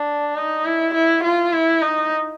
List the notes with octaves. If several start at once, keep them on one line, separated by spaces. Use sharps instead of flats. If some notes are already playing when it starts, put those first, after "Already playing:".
Already playing: D4
D#4
E4
E4
F4
E4
D#4